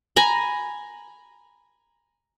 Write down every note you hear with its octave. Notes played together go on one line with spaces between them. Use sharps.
G#5 A#5 B5